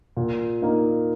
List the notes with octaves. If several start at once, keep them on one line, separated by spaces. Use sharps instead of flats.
A#2
A#3 D#4